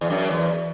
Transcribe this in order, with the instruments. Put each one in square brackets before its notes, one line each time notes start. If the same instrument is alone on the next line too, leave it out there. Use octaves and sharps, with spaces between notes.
[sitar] E2
F#2
E2